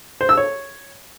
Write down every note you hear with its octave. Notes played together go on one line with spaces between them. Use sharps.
C5
E6
C#5